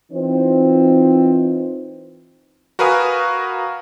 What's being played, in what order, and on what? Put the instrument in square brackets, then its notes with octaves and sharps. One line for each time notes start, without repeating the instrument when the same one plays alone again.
[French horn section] E3 C4 D#4 F4 B4 C5
[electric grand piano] F#4 A#4 B4 F5 G#5 D#6